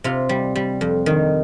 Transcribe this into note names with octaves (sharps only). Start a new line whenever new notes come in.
C3 F4
G3
G3
F2
D#3